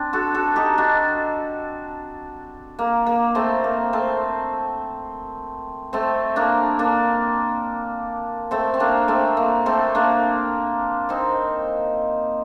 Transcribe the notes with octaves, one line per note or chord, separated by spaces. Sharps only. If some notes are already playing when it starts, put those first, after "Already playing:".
Already playing: C4 D4
F#4 A4
F#4 A4
D#4 G4
D4 F#4
A#3
A#3
A3 C4
A#3
A3 C4
A3 C4
A#3 D4
A#3 D4
A3 C4
C4
A#3 D4
A3 C4
A#3
A3 C4
A#3 D4
C4 D#4